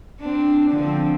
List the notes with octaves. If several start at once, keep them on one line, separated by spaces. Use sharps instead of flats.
C4 D4
D3 F3 C4